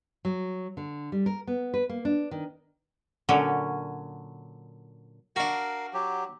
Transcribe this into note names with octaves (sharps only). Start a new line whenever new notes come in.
F#3
D3
G3
A#4
B3
B4
A#3
D4
D#3
A#2 D3 F#3 C#4
D4 F#4 A#4 F5
F#3 G4